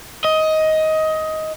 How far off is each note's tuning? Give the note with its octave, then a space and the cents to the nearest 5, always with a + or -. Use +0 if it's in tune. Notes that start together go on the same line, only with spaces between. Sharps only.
D#5 +15